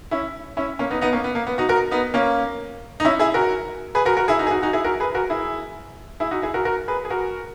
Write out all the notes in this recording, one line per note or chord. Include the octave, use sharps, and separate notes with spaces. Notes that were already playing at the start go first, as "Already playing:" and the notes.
C#4 E4
C#4 E4
A#3 C#4
B3 D#4
B3 D#4
A#3 C#4
B3
A#3
B3
D#4 F#4
F#4 A#4
B3 D#4
A#3 C#4
D#4
C#4 E4
E4 G#4
F#4 A#4
G#4 B4
F#4 A#4
F#4 A#4
E4 G#4
D#4 F#4
G#4
D#4 F#4
D#4 F#4
E4 G#4
F#4 A#4
G#4 B4
F#4 A#4
E4 G#4
E4 G#4
D#4 F#4
E4 G#4
F#4 A#4
F#4 A#4
G#4 B4
G#4
F#4 A#4